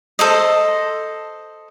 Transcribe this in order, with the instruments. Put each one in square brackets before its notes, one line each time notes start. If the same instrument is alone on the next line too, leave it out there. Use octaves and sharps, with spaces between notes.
[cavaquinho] A4 C5 D#5